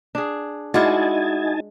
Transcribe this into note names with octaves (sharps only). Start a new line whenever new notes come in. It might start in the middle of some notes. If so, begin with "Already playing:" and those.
D4 G#4
G#3 D#4 E4 F#4 D5 F5 G#5 A5